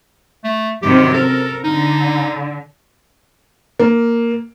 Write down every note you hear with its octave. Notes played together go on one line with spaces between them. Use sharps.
A3
F#2 C3 D#3 G4
A4 A#4
D3 D#4
A#3